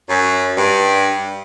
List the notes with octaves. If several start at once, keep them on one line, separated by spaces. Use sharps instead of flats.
F#2
G2